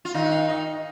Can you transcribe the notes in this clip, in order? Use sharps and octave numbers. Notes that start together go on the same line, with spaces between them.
F4
D#3 D#4 F5
F5
D#5